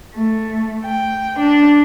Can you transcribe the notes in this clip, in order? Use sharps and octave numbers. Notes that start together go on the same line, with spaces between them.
A3
G5
D4